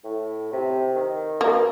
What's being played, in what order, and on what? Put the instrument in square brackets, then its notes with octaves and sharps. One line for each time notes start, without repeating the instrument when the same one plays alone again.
[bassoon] A2
C3
D#3
[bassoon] B2 [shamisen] A#3